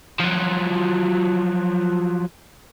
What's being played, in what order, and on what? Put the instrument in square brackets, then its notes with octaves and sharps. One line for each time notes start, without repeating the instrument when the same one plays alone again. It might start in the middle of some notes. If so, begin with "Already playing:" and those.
[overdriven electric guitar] F3 F#3